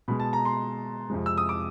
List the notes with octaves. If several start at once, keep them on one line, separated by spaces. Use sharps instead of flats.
B2 G#3 B5
A5
A#5
C6
F2 C3 F3 G#3
E6
D#6
D6